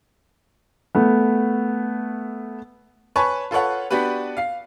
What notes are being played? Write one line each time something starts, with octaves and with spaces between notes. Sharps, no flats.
A3 B3
B4 C#5 G#5 A5 B5 C#6
F4 A4 B4 C#5 F#5
B3 D4 F#4 G4 B4
F5 C7